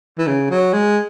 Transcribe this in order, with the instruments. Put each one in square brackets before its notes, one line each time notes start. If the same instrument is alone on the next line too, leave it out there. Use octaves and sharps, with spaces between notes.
[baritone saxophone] E3
C#3
F#3
G#3